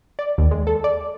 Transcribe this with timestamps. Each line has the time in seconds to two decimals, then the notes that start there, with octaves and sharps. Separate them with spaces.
0.19 D5
0.38 D#2
0.51 G#3
0.67 A4
0.84 D5